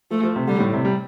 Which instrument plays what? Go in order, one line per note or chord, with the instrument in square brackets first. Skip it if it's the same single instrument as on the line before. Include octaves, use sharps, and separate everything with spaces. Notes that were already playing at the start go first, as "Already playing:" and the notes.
[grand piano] F3 [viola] A3
[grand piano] F3
C3
[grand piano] D3 [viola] G3
[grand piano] A2
C3
G3